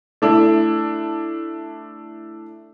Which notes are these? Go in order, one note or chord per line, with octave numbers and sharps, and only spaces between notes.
A3 D4 E4